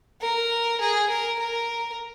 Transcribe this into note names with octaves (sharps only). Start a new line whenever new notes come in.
A#4
G#4
A#4
A#4